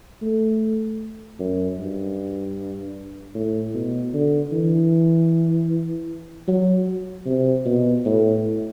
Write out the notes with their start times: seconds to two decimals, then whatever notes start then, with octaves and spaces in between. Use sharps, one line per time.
0.22 A3
1.39 F#2
1.79 G2
3.35 A2
3.74 B2
4.14 D3
4.52 E3
6.48 F#3
7.26 C3
7.66 B2
8.05 A2